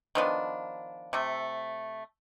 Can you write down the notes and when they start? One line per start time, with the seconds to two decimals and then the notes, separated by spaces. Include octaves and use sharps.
0.15 D#3 F3 B3 D4
1.13 C3 A3